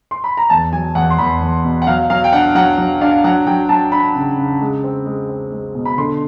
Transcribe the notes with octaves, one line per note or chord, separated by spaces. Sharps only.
C6
B5
A#5
E2 A5
F#3 G#5
E2 F#5
C6
E2 B5
E2
B2
F#5
F#3 F5
F#3 F5
G5
D4 F#5
F#3 F#5
F#3
D4 F5
F#3 F#5
F#3 G5
F#3 A5
D4 B5
C#3
C#3
G#3
C4
G#3
C4
G#3
B2
B5
D3 C6